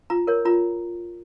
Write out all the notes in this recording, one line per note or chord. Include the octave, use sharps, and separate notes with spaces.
F4 A#5
A#4 C#5
F4 A#5